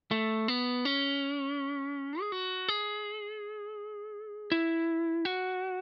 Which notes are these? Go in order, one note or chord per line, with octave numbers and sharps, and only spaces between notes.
A3
B3
C#4
G#4
F#4
G#4
E4
F#4